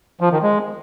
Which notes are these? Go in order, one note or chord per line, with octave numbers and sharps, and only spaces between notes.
F3
D#3
G#3